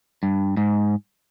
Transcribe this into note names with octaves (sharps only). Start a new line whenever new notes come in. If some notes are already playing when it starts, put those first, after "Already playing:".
G2
G#2